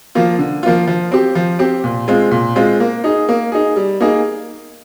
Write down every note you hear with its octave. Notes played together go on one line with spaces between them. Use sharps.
F3 A#3 F4
D3
F3 A#3 F4
F3
C4 G4
F3
C4 G4
A#2
G#3 C4 F4
A#2
G#3 C4 F4
A#3
D#4 G#4
A#3
D#4 G#4
G3
A#3 D#4 G#4